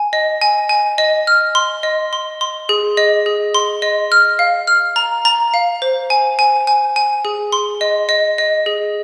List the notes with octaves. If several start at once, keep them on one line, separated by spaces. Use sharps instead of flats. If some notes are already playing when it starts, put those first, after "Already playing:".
Already playing: G#5
D#5
G#5
G#5
D#5
F6
C6
D#5
C6
C6
G#4
D#5
G#4
C6
D#5
F6
F5
F6
A#5
A#5
F5
C5
G#5
G#5
G#5
G#5
G#4
C6
D#5
D#5
D#5
G#4